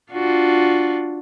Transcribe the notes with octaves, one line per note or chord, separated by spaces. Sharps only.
D4 F4 F#4